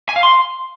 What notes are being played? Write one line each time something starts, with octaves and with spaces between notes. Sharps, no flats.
G#5
F5
C6